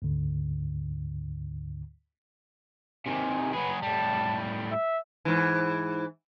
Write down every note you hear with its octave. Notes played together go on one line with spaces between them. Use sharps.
D2 G#2 D3
C3 D#3 G#5
F#3 G#4 B4
A2 G3 A5
E5
G#2 E3